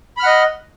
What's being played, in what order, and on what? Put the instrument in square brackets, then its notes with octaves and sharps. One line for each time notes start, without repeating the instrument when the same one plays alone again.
[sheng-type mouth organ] B5
F6
F#5
D#5